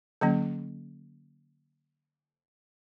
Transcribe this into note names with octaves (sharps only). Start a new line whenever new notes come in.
D3 F#3 A#3 C#4